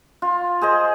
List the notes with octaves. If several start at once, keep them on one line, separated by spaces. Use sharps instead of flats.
F4
G#4 C5 D#5